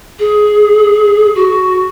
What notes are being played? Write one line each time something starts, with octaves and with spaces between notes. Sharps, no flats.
G#4
F#4